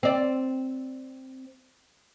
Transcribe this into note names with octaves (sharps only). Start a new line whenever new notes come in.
C4 D5